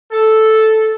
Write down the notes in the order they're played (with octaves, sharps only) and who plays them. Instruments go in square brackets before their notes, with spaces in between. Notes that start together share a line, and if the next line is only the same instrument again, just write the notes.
[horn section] A4